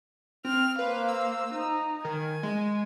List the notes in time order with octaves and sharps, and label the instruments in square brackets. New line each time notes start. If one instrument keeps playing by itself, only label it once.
[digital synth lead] C4 [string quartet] F6
[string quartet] A#3 C5 F5 [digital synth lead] B4
[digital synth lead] E6
[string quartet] D#4
[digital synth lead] D#3 [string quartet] G#5
[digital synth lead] G#3